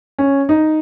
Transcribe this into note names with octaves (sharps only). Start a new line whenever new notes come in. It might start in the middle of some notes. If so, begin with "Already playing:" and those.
C#4
D#4